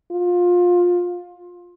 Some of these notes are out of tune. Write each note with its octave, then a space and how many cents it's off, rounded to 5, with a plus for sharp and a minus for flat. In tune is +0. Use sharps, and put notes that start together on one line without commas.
F4 +20